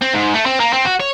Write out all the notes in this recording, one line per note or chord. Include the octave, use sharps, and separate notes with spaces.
C4
G#2
A3
C4
A#3
C4
F#4
C#5